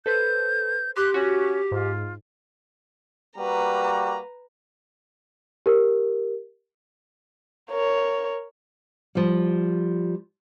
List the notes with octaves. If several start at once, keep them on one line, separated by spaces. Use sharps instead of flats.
A4 B4 C5 G6
G4 C6 D6 F#6 G6
C#4 F#4
G#2 F4
G3 A#3 F#4 B4 A#5
G4 A#4
A#4 C#5
F3 G3